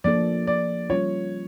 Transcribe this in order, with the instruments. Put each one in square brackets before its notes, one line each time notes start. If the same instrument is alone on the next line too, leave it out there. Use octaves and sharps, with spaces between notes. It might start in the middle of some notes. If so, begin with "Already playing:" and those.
[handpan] F3 A#3 D4 A4 [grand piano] D5
[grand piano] D5
[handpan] G3 C#4 F4 [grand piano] C#5